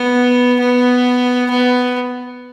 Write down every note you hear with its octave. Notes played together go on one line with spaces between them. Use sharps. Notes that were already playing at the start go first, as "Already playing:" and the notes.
Already playing: B3
B3
B3